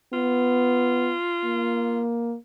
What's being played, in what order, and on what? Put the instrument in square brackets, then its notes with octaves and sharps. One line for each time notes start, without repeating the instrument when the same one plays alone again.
[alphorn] B3 [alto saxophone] F4
[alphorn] A#3